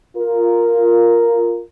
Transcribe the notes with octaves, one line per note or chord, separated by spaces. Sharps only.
F4 A#4